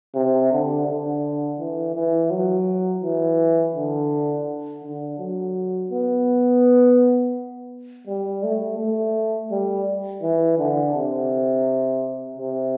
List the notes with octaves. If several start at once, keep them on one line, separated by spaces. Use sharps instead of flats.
C3
D3
D3
E3
E3
F#3
E3
D3
D3
F#3
B3
G3
A3
A3
G3
E3
D3
C3
C3